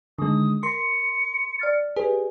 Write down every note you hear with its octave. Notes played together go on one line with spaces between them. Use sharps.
D3 D#3 G#3 D#6
A#4 C6 C#7
D5 F6 A6
G4 G#4 B4